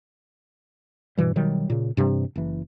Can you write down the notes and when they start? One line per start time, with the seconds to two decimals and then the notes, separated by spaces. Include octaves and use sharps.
1.17 G2 B2 E3 G3
1.36 B2 D#3 F#3 G3
1.70 A#2 C#3
1.97 G2 C3 E3 G3
2.36 F#1 E3